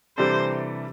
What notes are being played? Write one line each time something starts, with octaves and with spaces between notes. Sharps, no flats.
C3 E3 G3 D4 A4 C5